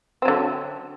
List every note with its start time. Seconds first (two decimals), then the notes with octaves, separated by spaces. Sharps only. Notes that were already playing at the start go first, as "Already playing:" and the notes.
0.22 C4
0.25 F#3
0.28 D3